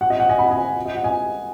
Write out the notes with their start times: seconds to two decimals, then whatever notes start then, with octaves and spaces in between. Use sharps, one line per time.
0.01 F#5
0.10 D#5
0.20 F#5
0.29 D#5 G#5
0.38 F#5 B5
0.51 D#5 G#5
0.85 D#5
0.95 F#5
1.04 D#5 G#5